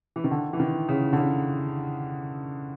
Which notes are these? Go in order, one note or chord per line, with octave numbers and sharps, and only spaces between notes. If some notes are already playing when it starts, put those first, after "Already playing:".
E3
D#3
D3
E3
D#3
C#3
D3
C#3